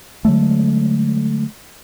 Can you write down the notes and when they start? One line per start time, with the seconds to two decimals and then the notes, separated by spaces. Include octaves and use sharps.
0.25 D3 F#3 G#3 A3